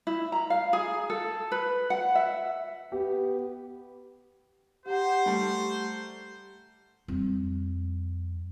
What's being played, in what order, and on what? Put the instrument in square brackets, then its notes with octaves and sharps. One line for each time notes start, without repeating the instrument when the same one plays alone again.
[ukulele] E4
A#5
F5
G#4
A4
B4
F#5
E5
[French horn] B3 [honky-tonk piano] G4
[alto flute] G4 [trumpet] C5 [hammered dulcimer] F#5 A#5
[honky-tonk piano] G3 A3
[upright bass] F2 G3